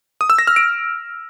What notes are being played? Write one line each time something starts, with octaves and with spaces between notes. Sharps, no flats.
D#6
E6
A#6
F6
D7